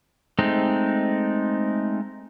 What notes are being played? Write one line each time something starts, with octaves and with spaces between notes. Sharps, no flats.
G#3 A3 C4 D#4